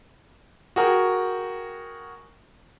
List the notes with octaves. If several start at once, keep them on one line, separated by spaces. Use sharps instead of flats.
F#4 G#4 A#4 G5